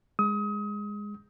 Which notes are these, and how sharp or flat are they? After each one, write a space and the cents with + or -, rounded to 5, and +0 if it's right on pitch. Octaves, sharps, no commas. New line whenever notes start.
G#3 -10 D#6 +30